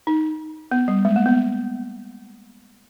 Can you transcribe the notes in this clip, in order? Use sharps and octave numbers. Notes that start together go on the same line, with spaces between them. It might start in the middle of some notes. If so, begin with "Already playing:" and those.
D#4
B3
G3
G#3
A#3
B3